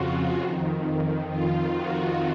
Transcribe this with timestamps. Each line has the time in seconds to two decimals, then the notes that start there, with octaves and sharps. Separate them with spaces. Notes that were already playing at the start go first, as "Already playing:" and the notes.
Already playing: F2 C#3 F4 F#4
0.40 F2 D#3
1.29 F4
1.74 F#4